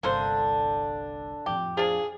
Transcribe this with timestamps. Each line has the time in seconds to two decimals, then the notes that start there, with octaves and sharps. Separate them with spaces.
0.03 G1 C2 D3 A#3 D4 A4 C5
1.46 F2 A2 G4
1.77 F3 D4 G#4